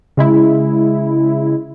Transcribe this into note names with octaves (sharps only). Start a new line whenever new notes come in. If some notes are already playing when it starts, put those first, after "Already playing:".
C#3 G#3 E4